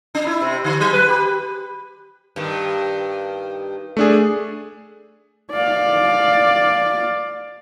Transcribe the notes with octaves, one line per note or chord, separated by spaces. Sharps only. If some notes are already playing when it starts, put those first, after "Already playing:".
D4
E4
C3
D3
F#3
B4
G4
G2 D#3
A3 D4 G#4
D5 F5